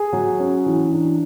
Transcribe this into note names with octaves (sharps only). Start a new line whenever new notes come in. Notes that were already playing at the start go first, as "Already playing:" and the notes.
Already playing: G#4
F#3
C#4
E3
D4